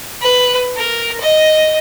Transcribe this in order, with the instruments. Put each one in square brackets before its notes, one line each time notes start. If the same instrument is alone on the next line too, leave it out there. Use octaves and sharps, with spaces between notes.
[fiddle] B4
A#4
D#5